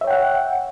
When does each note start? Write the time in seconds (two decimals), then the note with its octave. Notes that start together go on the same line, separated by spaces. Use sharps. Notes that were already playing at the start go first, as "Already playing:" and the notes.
0.01 E5
0.04 C#5
0.07 G5
0.10 F#5